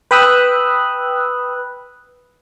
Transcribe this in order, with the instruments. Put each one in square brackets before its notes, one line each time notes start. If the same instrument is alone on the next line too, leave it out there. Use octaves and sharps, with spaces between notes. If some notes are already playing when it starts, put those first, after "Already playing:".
[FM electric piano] B4 G5 B5 D#6 E6 F#6